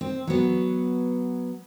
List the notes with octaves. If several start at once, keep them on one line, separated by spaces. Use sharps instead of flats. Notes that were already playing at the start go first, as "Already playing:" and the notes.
C4
F#3 B3